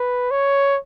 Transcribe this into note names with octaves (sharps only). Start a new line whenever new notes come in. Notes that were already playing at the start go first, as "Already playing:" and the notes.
Already playing: B4
C#5